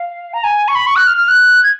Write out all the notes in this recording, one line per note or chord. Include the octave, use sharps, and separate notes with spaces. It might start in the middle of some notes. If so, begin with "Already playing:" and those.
Already playing: F5
A#5
G#5
C#6
B5
C#6
F#6
F6
F6
F#6
G#6